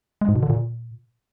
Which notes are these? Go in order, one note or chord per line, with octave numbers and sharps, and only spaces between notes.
G#3
G#2
B2
D3
A#2